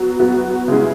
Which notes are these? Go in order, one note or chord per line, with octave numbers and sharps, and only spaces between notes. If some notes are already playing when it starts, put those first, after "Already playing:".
Already playing: F#3 B3 F#4
F#3 B3 F#4
C#3 G#3 E4 G#4